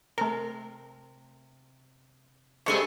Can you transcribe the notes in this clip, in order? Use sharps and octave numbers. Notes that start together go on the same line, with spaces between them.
C3 A3 A#4
G2 C3 G#3 A3 A4 G#5 C#6